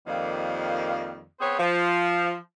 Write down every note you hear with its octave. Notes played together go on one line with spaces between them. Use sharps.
F2 D#3 F3 G3 A#3
B3 C4 G#4 C5 C#5
F3